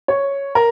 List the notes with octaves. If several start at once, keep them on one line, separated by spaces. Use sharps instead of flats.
C#5
A#4